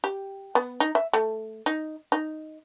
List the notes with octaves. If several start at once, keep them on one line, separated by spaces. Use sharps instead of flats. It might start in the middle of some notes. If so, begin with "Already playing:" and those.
G4
B3
D#4
E5
A3
D#4
D#4